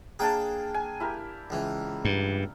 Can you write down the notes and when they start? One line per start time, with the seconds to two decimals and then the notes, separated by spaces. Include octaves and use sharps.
0.19 A#3 D4 G#4 G5 A5
0.74 G#5
1.00 E4 G4 A#4
1.50 C#2 E3
2.05 G2